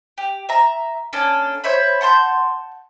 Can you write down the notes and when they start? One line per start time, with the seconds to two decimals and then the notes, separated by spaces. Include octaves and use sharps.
0.18 G4
0.49 E5 A#5
1.13 A#3 C#4 D4 A4
1.64 C5 C#5 E5 B5
2.01 F#5 A5 C6 G6